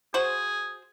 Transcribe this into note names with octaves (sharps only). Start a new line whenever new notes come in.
F#4 G#4 C5